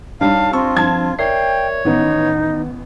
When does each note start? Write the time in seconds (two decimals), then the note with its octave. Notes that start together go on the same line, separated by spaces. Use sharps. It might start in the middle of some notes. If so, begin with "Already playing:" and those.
0.21 G2 G3 D4 D#4 C#5 F5 A5
0.53 C4 F4 A5 C#6 E6
0.76 G2 F3 A5 G#6
1.19 A#4 C#5 D5 E5 G5 C7
1.85 A1 D#3 B3 D#4